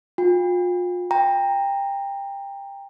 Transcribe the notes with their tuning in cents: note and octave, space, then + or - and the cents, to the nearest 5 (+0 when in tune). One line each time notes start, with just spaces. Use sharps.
F4 +35 G5 +40
G5 +20 A#5 +0